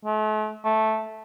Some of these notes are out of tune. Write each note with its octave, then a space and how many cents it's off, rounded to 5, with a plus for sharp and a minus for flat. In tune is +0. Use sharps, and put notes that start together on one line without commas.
A3 -40
A3 -5